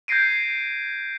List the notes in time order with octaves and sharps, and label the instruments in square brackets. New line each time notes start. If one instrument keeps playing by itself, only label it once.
[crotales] G6 G#6 A#6 C7 D7 D#7